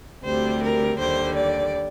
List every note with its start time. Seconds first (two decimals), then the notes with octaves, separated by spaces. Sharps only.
0.24 D2 C3 G3 C5
0.62 A#4
0.99 D#2 D3 G3 C5
1.35 D5